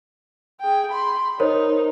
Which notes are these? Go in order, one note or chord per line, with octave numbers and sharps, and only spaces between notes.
G#4 G5
B5 C6
D#4 A#4 C5 C#5